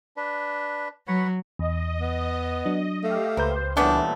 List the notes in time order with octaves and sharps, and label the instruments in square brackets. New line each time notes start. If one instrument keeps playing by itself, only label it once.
[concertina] D4 B4
[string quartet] F#3 [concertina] B4 C#5 F#5
[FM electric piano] E2 [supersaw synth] D#5
[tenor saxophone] B3
[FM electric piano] F#3 D4
[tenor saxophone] A3 [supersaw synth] G4 F5
[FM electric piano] C#2 B4 G6 [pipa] A#3 [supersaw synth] C5
[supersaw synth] A#2 E3 G3 [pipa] A3 B3 C#4 [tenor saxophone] D4